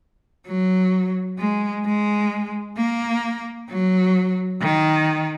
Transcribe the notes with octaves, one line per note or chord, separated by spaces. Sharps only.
F#3
G#3
G#3
A#3
F#3
D#3